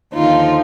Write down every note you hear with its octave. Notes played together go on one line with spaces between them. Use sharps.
D#2 D3 F3 D#4 F4